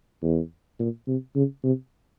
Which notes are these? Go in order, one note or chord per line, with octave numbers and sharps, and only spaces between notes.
E2
A#2
C3
C#3
C3